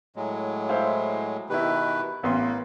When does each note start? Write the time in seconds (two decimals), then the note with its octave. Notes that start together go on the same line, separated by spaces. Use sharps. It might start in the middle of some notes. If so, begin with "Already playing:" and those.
0.16 A2 F#3 G#3
0.69 E4 C5 F5
1.50 B2 D#3 E4 G4 B4
2.23 A1 A#3 B3 C6